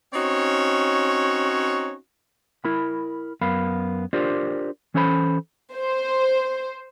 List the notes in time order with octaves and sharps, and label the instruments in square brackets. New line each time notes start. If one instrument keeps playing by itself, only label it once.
[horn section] C4 C#4 D#4 F#4 C#5
[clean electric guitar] E4 A#4 B5
F#2 B3 A#4 F5 B5
D4 F4 G4 A#4 C5 D5
E3 C#4 A4 C5 D#5 B5
[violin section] C5